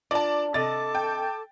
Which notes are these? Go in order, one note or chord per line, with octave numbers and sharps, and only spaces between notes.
D4 F4 A#4 D5 A5
C3 A4 D#5 A5 D6 A6
G5